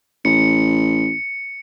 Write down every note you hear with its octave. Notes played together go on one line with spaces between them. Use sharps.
A1 C#7